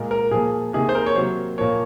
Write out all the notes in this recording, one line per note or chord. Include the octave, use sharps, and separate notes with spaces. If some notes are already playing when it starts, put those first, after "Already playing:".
Already playing: A#2 G#3 A#4
A#4
A#2 F3 A#3 G#4
C3 D#3 A#3 G#4
C5
A#4
C#5
C3 F#3 A#3 C5
A#2 F3 A#3 C#5